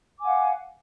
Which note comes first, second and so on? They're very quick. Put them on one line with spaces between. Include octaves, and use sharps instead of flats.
D6 G#5 F#5 F5